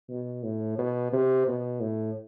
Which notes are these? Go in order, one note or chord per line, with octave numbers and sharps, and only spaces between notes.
B2
A2
B2
C3
B2
A2